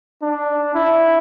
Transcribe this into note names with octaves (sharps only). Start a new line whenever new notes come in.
D4
E4